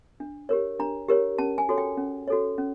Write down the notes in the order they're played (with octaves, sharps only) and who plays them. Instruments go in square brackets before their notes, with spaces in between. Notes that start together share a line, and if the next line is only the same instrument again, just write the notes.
[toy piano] D4
G4 A#4 C#5
D4 A#5
G4 A#4 C#5
C#4 A5
G#5
F#4 A4 C#5
G5
C#4
F#4 A4 C#5
C#4